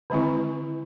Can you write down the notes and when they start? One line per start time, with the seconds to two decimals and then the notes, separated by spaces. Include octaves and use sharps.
0.10 D3 D#3 G#3 C4 E4